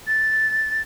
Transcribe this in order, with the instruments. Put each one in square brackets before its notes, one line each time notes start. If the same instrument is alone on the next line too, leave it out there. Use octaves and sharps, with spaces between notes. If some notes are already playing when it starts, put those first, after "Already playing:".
[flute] A6